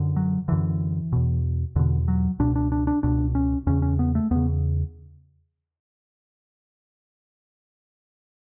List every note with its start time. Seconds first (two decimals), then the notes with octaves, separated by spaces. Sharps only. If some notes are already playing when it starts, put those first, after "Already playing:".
Already playing: F#2 D3
0.16 F#3
0.48 F#2 D3 E3
1.13 E2 B2
1.76 E2 B2 D3
2.08 F#3
2.39 C#2 B2 D4
2.56 D4
2.72 D4
2.87 D4
3.03 C#2 B2 D4
3.35 C#4
3.67 E2 C#3 C#4
3.82 C#4
3.99 B3
4.15 A3
4.31 E2 C#3 B3